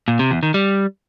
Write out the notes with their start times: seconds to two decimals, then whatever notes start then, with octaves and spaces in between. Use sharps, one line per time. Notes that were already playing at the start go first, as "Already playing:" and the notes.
0.08 A#2
0.19 C3
0.31 E2
0.43 D#3
0.54 G3